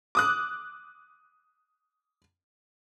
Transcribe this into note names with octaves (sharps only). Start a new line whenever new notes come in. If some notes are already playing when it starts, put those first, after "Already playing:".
D6 D#6 F#6